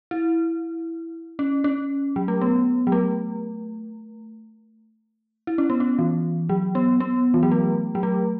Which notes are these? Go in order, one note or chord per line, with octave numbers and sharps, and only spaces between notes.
E4
C#4
C#4
F#3
A3
B3
F#3
A3
E4
C#4
B3
C#4
E3
F#3
B3
B3
E3
F#3
A3
F#3
A3